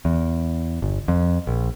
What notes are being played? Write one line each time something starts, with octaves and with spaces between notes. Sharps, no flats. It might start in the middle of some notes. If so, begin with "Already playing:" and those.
E2
G1
F2
A#1